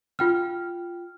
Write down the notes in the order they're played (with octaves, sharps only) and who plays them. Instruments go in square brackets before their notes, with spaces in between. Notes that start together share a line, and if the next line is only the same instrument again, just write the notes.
[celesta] F4 G5 F6